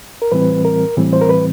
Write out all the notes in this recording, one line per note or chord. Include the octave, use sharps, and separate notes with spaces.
A#4
A2 E3 G3 C4 B4
A#4
A2 E3 G3 C4
C5
A#4
B4